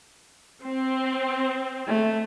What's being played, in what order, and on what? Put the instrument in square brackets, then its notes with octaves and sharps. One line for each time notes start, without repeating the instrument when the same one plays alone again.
[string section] C4
[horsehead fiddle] A3